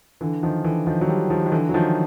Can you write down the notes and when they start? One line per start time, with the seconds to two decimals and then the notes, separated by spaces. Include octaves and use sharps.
0.21 D3 E3
0.43 D#3 F3
0.64 D3 E3
0.87 D#3 F3
1.01 F#3
1.08 F3 G3
1.30 D#3 F3
1.46 D#3
1.52 D3 E3
1.69 F#3
1.74 D#3 F3